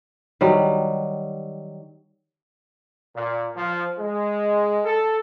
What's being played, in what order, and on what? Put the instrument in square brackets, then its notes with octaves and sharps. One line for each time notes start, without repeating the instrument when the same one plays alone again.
[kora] D#3 F#3 G3
[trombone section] A#2
F3
G#3
A4